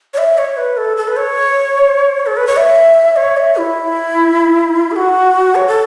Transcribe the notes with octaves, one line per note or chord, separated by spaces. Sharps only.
C#5
E5
C#5
B4
A4
A4
B4
C#5
A4
B4
C#5
E5
C#5
E5
E4
A4
F#4
C#5
A4